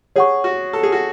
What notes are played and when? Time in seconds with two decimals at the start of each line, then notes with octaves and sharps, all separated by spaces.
0.16 G#4 C#5 F#5 C#6
0.44 F#4
0.73 A4
0.83 G#4
0.92 F#4